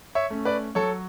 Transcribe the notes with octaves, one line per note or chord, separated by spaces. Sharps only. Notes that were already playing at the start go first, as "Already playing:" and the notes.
C#5 E5
A3 C#4
B4 D5
F#3 A4 C#5